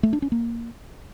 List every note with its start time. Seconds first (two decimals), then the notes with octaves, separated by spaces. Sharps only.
0.03 A3
0.13 D4
0.22 C#4
0.32 A#3